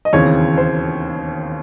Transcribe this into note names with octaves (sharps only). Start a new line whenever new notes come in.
D#5
E1 D#2 C#3 E3 C4 C#5
C5